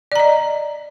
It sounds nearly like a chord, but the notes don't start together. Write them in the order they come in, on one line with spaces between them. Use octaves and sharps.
D5 A#5 D#5